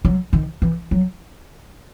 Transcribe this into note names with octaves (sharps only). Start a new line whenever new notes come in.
F#3
D#3
E3
F#3